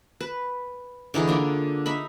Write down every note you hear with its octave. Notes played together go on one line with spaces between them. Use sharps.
B4
D3 E3 D#4 G#4
A#3 D4 F4
D#4 E5 B5